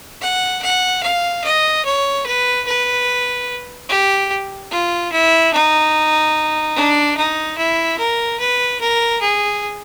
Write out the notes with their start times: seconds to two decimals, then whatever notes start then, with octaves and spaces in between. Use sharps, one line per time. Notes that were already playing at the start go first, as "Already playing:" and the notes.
0.21 F#5
0.62 F#5
1.03 F5
1.44 D#5
1.85 C#5
2.26 B4
2.67 B4
3.89 G4
4.71 F4
5.12 E4
5.53 D#4
6.76 D4
7.16 D#4
7.58 E4
7.98 A#4
8.39 B4
8.80 A#4
9.21 G#4